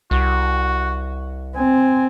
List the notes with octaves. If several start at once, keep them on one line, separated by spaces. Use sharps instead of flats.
C2 F#4
C4 G#5